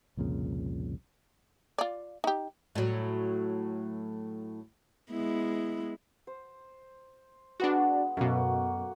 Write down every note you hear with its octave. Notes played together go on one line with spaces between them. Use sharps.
C2 F2 A#2 C#3
F4 D5
D#4 G4
A2 F#3
G#3 B3 E4
C5
G#3 B3 D4 F#4
F#2 B2 A3 A#3 F#4